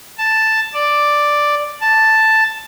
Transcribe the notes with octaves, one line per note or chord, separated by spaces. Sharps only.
A5
D5
A5